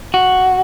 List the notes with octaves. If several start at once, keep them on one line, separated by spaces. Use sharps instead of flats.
F#4